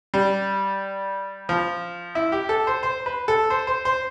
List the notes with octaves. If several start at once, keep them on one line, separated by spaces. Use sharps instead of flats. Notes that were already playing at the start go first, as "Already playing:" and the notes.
G3
F3
E4
G4
A4
C5
C5
B4
A4
C5
C5
C5